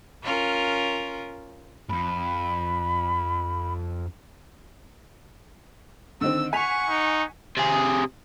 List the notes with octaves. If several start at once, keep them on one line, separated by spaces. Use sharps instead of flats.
C#4 F4 A#4
F2 G#2 B5
D3 D#3 C4 E6
F#5 G#5 C#6 B6 F7
D#4
C3 G#4